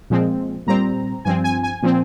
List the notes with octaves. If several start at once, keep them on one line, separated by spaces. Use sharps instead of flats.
A#2 F3 G#3 C4
A#2 G3 C4 A#5
G2 F3 C4 G#5
G#5
G#5
A#2 F3 C4